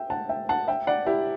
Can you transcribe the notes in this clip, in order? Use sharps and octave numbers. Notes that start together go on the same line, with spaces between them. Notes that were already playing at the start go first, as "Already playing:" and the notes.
Already playing: E5 G5
F#5 A5
E5 G5
F#5 A5
E5 G5
D5 F#5
E4 G4